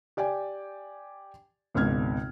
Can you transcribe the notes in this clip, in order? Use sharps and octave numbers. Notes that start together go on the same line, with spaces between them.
G4 D5 G5 G#5
G#1 C#2 B2 F6 G#6